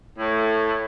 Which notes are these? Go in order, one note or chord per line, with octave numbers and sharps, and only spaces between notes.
A2